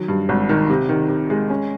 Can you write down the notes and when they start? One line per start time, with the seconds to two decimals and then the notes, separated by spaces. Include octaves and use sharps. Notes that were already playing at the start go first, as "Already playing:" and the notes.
Already playing: D#3 F#3
0.08 G2
0.29 G#1
0.49 D#3
0.69 C3
0.89 D#3
1.09 C3
1.30 G#3
1.50 C#4